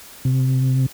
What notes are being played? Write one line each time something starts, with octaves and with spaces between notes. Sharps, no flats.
C3